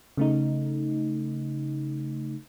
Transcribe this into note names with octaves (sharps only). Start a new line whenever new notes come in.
C#3 A3 D#4